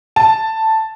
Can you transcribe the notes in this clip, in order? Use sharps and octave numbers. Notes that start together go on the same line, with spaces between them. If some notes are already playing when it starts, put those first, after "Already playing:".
A5